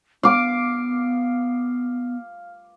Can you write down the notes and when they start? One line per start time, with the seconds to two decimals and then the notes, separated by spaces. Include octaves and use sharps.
0.23 B3 F5 D6